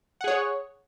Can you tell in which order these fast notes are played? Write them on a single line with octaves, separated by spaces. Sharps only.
F#5 G#4 C#5